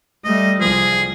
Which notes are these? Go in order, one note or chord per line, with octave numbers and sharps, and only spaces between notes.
G3 A3 D#5
C2 F3 G#4